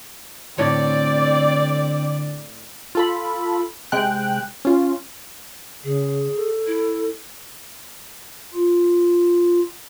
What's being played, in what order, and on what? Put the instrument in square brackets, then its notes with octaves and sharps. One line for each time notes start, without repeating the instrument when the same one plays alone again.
[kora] A2 C#5 [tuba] D3 [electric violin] C4 [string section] D5
[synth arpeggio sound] F4 A4 B5
C3 G#3 G5 F#6
C#4 F4
[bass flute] C#3 [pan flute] G#4
[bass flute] A4
[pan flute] E4
[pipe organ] F4